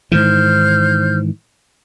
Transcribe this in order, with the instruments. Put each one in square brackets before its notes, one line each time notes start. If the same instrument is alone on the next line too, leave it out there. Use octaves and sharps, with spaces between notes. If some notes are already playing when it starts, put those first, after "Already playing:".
[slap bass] G#2 D#3 E3 [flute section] C5 F6 G6